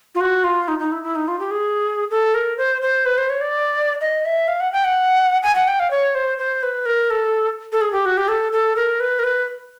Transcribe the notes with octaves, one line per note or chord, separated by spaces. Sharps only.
F4
F#4
F4
D#4
D#4
E4
E4
D#4
F4
G4
G#4
A4
A#4
C5
C5
B4
C5
C#5
D5
D#5
E5
F5
F#5
G5
F#5
G#5
F#5
G5
F5
C#5
C5
C5
B4
A#4
A4
A4
G#4
G4
F#4
G4
A4
A4
A#4
B4
A#4
B4